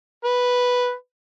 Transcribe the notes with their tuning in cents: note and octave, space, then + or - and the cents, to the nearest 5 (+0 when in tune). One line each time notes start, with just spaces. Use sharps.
B4 -5